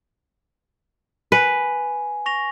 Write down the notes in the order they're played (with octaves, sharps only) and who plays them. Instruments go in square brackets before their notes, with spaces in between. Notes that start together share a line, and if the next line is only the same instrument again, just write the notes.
[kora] B4 [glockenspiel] G#5
[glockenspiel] C#6 A#6 F7